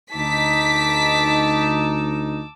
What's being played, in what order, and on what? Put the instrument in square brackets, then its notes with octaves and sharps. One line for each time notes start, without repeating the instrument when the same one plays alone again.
[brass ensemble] D2 D#4 [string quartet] A5 D6 E6 [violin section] B6